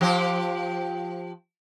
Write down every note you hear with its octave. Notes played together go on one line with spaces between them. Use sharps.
F3 G4 C5